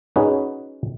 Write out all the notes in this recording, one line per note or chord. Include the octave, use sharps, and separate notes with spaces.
C#4 D#4 F#4 G#4 B4